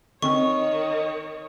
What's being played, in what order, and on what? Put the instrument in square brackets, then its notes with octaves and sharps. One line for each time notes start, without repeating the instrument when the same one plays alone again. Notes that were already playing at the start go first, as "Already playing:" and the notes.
[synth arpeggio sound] D3 C4 C#4 [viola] D#3 C#5 [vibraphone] D#5 [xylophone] C#6